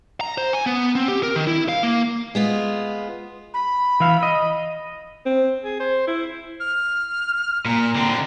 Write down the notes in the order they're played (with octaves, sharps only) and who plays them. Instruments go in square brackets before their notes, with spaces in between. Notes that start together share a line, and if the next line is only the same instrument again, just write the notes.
[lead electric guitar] A#5
C5
G#5
B3
C4
G4
A#4
D#3
E4
F5
A#3
[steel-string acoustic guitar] G#3 B3 F4
[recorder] B5
[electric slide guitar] E3 E4 F5
D#5
[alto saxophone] C4
G#4
C5
E4
[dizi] F6
[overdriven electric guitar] A#2 [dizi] A#5
[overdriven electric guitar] D3 C4